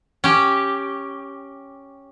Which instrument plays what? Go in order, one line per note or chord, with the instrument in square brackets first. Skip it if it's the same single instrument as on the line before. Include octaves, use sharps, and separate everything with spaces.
[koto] C#4 G4